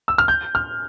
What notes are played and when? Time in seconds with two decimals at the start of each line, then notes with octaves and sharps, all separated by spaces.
0.08 E6
0.18 F6
0.28 G6
0.55 F6